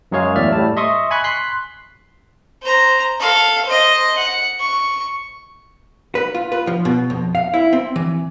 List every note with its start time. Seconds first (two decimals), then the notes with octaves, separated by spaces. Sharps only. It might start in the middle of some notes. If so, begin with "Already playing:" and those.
0.12 F#2 F#3 G#3 G#4 C#5 F5
0.36 E2 A2 D5 E5 F6
0.52 A2 G3 A5
0.77 D#5 E5 C6 C#6 D#6
1.11 G#5 B5 C#6 F#6
1.24 C6 F#6 B6 C7
2.63 C5 A#5
3.20 A4 F5
3.65 C5 D#5
4.17 F#5
4.60 C#6
6.15 B4
6.34 F4
6.52 B4
6.67 F3
6.85 B2
7.10 F2
7.35 F5
7.54 E4
7.73 C4
7.96 E3